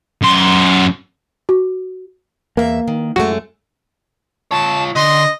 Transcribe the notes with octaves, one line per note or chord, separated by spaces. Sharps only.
F#2 C6
F#4
E2 A#3 E5
D#3
F#2 G#3 A3 F#4
F4 C#5 A5
D3 D#5 C6